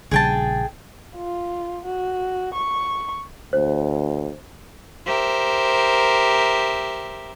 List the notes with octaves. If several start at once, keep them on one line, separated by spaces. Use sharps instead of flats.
A#1 C#3 G3 G#4 G5 A5
F4
F#4
C#6
D2 C5
G4 A#4 C5 E5